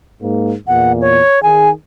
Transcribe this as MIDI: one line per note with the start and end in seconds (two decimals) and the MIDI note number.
0.21 0.54 44
0.21 0.54 58
0.67 1.19 40
0.67 1.19 46
0.67 0.93 78
1.01 1.42 73
1.43 1.71 51
1.43 1.71 68
1.43 1.70 80